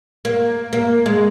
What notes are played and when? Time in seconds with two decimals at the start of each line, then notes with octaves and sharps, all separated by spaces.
0.25 A#3
0.73 A#3
1.06 G#3